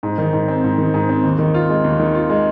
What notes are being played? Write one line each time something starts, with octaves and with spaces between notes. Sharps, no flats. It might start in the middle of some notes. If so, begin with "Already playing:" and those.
G#2
D#3
G#2
C4
G#2
D#3
G#2
C4
D#2
D#3
F4
G#3
D#2
D#3
F4
G#3